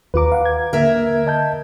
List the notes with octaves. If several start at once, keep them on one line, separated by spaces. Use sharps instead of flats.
D#2 F4 B4 A#5 D6
F5 F#5
G#6
D3 A#3 A#4 E5
D#5 A5 G6